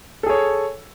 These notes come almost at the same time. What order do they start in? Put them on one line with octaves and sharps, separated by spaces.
A4 G#4 C#5